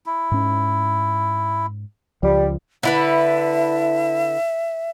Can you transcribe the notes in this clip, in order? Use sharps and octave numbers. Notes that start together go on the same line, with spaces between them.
E4
G#2 C#4
C#2 F3 G3
D3 E4 B4 E5